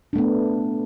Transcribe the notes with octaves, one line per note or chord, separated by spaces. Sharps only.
A3 B3 D4